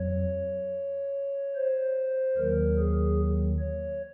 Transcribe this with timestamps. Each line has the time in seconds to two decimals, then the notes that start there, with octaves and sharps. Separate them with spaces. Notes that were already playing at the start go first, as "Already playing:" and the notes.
Already playing: F2 F#3 C#5
1.56 C5
2.37 D#2 D#3 F#3 A#4
2.78 G#4
3.59 C#5